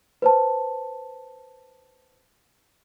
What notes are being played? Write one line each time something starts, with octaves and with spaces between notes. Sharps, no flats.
B4 C5 A5